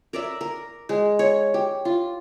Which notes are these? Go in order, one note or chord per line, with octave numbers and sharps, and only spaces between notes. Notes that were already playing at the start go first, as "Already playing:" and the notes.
A#4 D5 E5
A#4
G#3
C#5
G4
F4